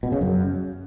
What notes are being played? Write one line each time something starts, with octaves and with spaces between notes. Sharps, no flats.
B2
C#3
F#2